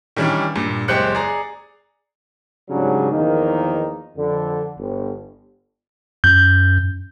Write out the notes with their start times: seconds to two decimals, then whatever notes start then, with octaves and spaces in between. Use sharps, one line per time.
0.16 D#3 E3 G3 C#4 D4
0.55 G2 A#2
0.88 F#1 G#3 G4 C5 F#6 C#7
1.15 G#4 D5 A#5
2.70 G#2 C#3 F#3 G3 D4
3.12 E2 D#3 F3 A#3 D#4
4.17 F2 D3
4.78 G1
6.24 F#2 G6